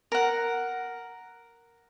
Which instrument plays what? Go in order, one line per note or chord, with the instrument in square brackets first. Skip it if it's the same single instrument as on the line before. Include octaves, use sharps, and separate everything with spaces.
[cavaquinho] A#4 F#5